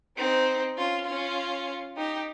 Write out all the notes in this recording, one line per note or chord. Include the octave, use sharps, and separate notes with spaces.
C4 D#4
C#4 F4
C#4 F4
D#4 G4